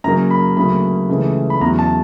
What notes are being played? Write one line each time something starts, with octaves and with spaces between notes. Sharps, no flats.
F#2 C#3 F#3 A#3 A#5
B5
D2 C#3 F#3 A#3 B5
C#2 C#3 E3 A3
B5
E2 C#3 F#3 A#5
A5